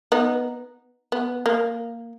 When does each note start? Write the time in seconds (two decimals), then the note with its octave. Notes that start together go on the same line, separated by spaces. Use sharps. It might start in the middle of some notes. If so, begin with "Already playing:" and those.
0.12 B3 D#4
1.12 B3
1.46 A#3